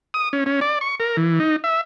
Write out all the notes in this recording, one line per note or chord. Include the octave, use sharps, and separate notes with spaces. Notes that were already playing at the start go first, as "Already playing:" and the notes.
D#6
C#4
C#4
D5
C#6
A#4
E3
D#4
E5